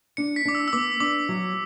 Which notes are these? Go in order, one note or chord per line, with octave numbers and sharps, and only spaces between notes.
D4 C#7
B6
D4 D6
E6
E6
B3 D6
D4 D6
F#3